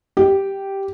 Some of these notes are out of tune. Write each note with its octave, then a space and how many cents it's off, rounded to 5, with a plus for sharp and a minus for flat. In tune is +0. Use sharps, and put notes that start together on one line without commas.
G4 -5